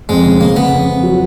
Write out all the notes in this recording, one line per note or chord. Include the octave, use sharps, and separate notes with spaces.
F2 G#3
C#3
C#3 A#3
C#3 B3
F2
F2
F#3